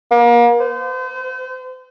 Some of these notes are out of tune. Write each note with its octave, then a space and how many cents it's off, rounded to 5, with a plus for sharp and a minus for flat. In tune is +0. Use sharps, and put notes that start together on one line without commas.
A#3 +35
C5 -40